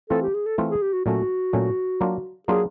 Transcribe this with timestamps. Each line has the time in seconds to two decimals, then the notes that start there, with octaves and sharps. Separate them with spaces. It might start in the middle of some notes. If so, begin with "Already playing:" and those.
0.10 E3 A3 C4 F4 A4
0.22 G4
0.35 G#4
0.46 A4
0.58 E3 A3 C4 F4
0.70 G#4
0.82 G4
0.93 F#4
1.06 A#2 F#3 A3 C#4 F#4
1.53 A#2 F#3 A3 C#4
2.01 F#3 A#3 D4 F4
2.48 F#3 A#3 D4 F4 G#4